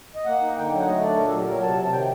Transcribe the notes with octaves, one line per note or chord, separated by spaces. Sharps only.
D#5
A#3 F#5
D#4
D3 G5
F#3
F#5
A3 D#5
D4 D5
A#2 A#4
A4
F#3
G4
F#3 A#4
C3 A5
C3 A5
D#3 G5